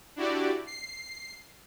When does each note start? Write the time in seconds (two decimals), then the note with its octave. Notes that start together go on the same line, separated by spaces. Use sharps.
0.16 D4 E4 F#4 G4 D5
0.67 C7